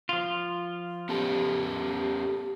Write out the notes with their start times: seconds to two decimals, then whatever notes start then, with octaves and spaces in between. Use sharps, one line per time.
0.09 F3 F4
1.09 B3 C#4 G4 A4